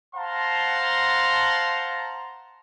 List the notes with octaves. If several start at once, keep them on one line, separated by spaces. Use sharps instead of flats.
C5 F5 F#5 A5 A#5 C6